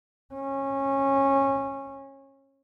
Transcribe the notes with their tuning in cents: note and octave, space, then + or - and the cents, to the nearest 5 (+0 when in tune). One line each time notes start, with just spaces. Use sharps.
C#4 -20